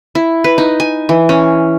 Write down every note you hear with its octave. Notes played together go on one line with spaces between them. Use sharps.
E4
B4
D#4
G#5
E3
C#4